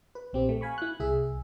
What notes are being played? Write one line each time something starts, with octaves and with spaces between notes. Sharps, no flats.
B4
A#1 C4 G4
A3
F5 G#5 B5 C#6
E4 F#6
C2 G#4 E5